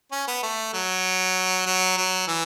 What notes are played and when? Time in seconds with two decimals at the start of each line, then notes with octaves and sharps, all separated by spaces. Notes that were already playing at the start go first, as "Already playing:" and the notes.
0.12 C#4
0.28 B3
0.43 A3
0.74 F#3
1.66 F#3
1.98 F#3
2.28 E3